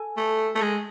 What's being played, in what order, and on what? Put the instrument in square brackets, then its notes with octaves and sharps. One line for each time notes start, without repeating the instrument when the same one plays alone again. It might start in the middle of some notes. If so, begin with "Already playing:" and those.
Already playing: [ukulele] A4 G#5
[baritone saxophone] A3
A3
G#3